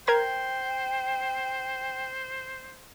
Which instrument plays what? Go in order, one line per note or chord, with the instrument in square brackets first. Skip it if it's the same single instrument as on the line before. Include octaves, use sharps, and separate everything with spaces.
[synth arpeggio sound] A#4 A#5 G#6 [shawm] C5 [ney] G5